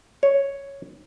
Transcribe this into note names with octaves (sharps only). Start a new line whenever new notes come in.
C#5